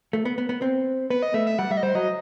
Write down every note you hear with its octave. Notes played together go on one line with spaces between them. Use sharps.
A3
B3
B3
B3
C4
B3 B4
D#5
A3 E5
E5
G3 F#5
G3 E5
D#5
G3 C5
F#3 D#5